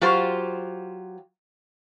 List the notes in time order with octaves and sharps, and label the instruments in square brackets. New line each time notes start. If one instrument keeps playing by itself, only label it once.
[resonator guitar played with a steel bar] F#3 F4 G4 C5